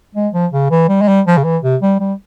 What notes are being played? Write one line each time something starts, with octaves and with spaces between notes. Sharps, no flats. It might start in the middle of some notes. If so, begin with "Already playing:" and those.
G#3
F3
C#3
E3
G3
G#3
G3
F3
C#3
E3
C3
G3
G3